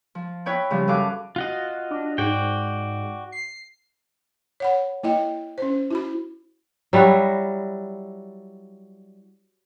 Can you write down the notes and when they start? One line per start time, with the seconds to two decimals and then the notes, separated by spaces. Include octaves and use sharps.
0.15 F3
0.46 E4 B4 C#5 G5 B5
0.70 C#3 F3 G3
0.88 F#2 A4 E5 F5 D6 F#6
1.36 F4 F#4 D#5
1.91 D4
2.18 G#2 F#4 D5 G5
3.32 C7
4.60 C#5 F#5 B5
5.03 A#3 E4 D#5 G5
5.58 C#4 C5
5.91 E4 F#4 B5
6.93 F#3 G3 E4 F#4